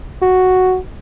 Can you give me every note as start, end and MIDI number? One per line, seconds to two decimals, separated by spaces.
0.22 0.77 66